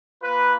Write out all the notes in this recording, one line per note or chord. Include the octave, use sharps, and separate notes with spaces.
A#3 F4 B4